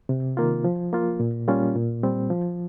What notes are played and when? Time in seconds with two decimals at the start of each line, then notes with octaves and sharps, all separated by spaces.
0.09 C3
0.37 D#3 A#3 F4
0.64 F3
0.92 A#3 F4
1.20 A#2
1.48 G3 A#3 C#4 F4
1.76 A#2
2.03 G3 C4
2.30 F3